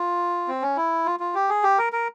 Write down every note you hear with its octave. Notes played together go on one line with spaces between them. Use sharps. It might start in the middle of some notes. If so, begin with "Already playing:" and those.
Already playing: F4
C4
C#4
E4
F4
F4
G4
G#4
G4
A#4
A#4